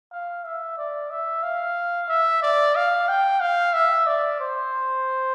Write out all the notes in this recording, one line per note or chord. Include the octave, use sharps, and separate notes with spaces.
F5
E5
D5
E5
F5
E5
D5
F5
G5
F5
E5
D5
C5